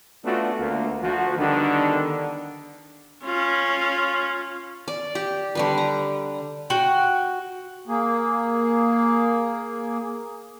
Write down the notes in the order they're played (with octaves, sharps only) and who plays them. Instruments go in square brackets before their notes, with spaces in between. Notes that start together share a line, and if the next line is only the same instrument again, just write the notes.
[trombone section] A3 B3 C#4 D4 F4 F#4
D2 A#3
D2 F3 F#4
D3 D#3 G3 B3 D4
[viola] C#4 F4
[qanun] D5
G4
D3 G3 B4
A#5
[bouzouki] F#4 G5
[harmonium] A#3 G#4